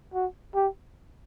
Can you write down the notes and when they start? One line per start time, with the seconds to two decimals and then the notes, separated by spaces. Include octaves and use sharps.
0.14 F#4
0.55 G4